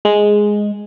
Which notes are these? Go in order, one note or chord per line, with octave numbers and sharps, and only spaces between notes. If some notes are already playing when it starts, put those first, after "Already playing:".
G#3